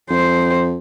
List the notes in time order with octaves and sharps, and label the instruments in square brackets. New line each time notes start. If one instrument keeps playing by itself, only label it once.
[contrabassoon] F2 [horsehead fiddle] C5